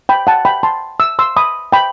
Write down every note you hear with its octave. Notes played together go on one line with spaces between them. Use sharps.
G5 B5
F#5 A5
G5 B5
A5 C6
E6
C6 E6
B5 D#6
G5 B5